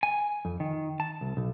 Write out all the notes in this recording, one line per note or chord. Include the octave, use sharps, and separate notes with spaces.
G#5
F2
D#3
A5
C2
B1